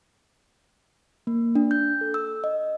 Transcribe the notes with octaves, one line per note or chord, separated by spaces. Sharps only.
A#3
D4
G6
A4
E6
D#5